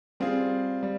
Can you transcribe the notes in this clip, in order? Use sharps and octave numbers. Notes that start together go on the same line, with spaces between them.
G3 C4 F4 G#4
G3